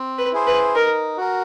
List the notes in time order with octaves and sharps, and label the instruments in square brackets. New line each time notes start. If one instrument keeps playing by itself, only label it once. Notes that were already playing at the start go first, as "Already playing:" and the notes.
Already playing: [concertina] C4
[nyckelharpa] B4
[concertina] E4 G#4 C5
[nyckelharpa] B4
[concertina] D#4 [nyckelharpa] A#4
[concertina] F#4 A#4